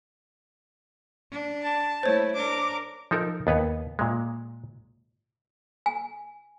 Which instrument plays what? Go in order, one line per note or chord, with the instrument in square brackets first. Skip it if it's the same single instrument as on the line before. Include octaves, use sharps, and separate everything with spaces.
[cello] D4
[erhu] A5
[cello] A3 E4 [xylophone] C5 C#5
[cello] D4 A#4 [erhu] D6
[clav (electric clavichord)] F3 D#4 A4 A#4
D#2 B3 B4 C#5
A#2 G#3
[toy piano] G#5